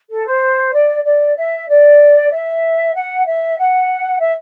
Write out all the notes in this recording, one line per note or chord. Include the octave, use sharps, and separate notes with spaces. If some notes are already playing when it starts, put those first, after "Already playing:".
A4
C5
D5
D5
E5
D5
E5
F#5
E5
F#5
E5